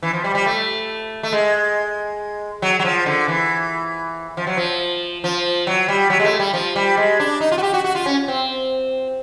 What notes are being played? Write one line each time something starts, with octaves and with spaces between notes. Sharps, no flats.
E3
F3
G3
G3
A3
A3
G#3
F#3
F#3
F3
D3
E3
F3
F#3
F3
F3
F#3
G3
F#3
G#3
A3
G3
F3
G3
G#3
D4
D#4
F4
F#4
G4
F#4
F#4
F4
C#4
C4